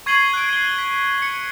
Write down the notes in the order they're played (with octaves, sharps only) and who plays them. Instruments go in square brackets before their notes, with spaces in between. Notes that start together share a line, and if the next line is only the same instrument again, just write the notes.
[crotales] C#6 G#6 C7 D#7 F#7 G7
F#6 D7
C7 G7
B6
C#7